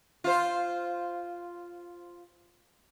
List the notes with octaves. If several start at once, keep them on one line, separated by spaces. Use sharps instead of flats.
F4 C5